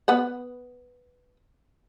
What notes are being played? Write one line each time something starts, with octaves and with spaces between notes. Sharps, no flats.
B3 B4 F#5